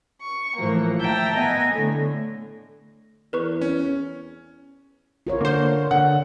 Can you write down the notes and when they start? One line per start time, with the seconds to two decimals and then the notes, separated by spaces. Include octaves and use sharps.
0.23 C#6
0.58 A2 E3 F3 A#3
0.99 E5 G5 A5 A#5
1.36 B3 D#5 G#5
1.74 A2 D3
3.33 E2 A#4 B4 C#6
3.61 C#4
5.27 F4 A#4 C#5
5.41 D3 A#3 C5
5.91 D3 F#5